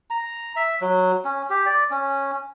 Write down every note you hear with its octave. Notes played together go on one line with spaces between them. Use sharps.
A#5
E5
F#3
C#4
G4
D5
C#4